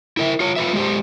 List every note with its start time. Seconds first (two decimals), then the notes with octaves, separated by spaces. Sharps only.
0.17 E4 A#4 E5
0.40 F4 C#5
0.56 F4 B4 E5
0.73 G#3 G4 C5